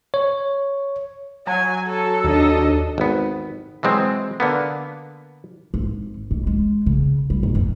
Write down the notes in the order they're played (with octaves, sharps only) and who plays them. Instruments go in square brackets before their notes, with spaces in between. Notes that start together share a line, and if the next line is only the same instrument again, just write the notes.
[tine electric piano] C#5
[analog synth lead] F#3 [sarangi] G#5
[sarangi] A4
[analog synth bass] D#2 [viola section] D4 D#5
[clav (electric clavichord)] G#1 B3
E3 F#3 G#3 C4
D3 A#3 B3
[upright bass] G#1
G#2
G#3
C#3
G3
G#2
F#2